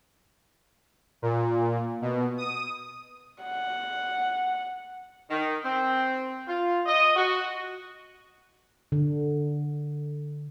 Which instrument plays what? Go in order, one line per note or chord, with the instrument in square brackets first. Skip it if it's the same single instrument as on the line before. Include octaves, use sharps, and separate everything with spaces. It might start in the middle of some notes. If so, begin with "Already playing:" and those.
[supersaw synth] A#2
B2
D#6
[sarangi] F#5
[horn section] D#3
C4
F4
D#5
F#4
[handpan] D3